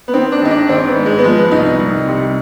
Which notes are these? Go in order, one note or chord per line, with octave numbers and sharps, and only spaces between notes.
B3
D#3 C4
D4
G#1 D#4
D4
G#1 C4
B3
G#2
G#3
B3
F3 G#3
B3
C2 D#4
D#4
C2
C3